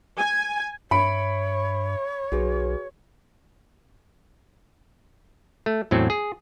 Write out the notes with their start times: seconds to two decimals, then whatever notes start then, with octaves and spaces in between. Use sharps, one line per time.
0.18 G#5
0.91 G2 C#5 E5 B5 C#7 D7
2.32 B1 F#4 G#4 B4
5.66 A3
5.91 E2 A2 F#3 C4
6.10 G#4